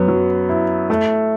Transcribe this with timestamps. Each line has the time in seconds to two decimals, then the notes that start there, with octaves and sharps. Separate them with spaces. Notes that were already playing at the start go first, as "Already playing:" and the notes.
Already playing: F#2 B3
0.08 F#3
0.49 E4
0.90 A3